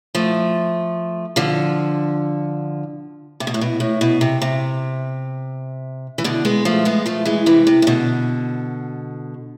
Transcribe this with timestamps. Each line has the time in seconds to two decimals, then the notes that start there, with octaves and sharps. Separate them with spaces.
0.15 F3 A3
1.36 D3 F3
3.40 C3
3.47 B2
3.54 A2
3.61 B2
3.80 A2
4.01 B2
4.21 C3
4.42 C3
6.18 E3
6.24 B2 D3
6.45 G#3 B3
6.65 F3 A3
6.85 G#3 B3
7.06 F3 A3
7.25 E3 G#3
7.46 C3 E3
7.67 C3
7.82 C3
7.87 B2 D3